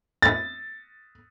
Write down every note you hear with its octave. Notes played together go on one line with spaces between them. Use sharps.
A6